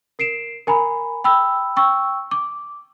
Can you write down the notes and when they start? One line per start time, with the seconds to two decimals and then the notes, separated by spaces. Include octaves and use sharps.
0.19 A#4 C7 D7 E7
0.67 A#4 G#5 A#5 B5
1.24 G5 B5 E6
1.76 G5 C#6 E6
2.31 D6